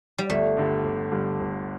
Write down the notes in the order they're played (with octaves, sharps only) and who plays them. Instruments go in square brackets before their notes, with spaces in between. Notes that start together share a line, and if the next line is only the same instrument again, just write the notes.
[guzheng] G3
[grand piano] G1 [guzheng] A3
[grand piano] G2 D3 G3
G1
G2 D3 G3
G1